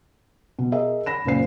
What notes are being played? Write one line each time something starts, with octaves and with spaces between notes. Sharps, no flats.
B2
G#4 A#4 D#5 E5
B5 A#6 E7
F#1 C#2 A#2 C5 C7